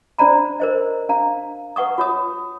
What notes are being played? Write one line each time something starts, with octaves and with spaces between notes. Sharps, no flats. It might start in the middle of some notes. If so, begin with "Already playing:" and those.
D4 C5 D5 A#5 B5
A#4 C5 D#5
D4 F5 A#5
B4 F#5 C#6 D#6
F4 C#5 D#6